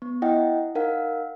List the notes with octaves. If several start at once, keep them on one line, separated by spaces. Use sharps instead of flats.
B3
E4 D#5 F#5 G5
D#4 A#4 F5 F#5